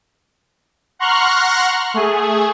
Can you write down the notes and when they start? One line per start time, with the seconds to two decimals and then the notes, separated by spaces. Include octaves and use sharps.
0.99 F#5 A#5 C6 C#6 F6 F#6
1.94 A3 G#4